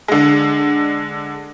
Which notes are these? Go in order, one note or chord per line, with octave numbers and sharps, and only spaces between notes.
D3 G#3